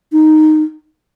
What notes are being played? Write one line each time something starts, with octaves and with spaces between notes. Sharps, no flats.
D#4